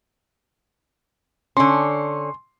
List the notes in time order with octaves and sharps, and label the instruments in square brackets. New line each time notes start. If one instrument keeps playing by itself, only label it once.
[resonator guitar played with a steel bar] D3 C#4 [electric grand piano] C6